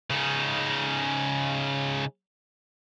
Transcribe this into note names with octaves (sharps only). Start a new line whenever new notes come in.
C#3 D#4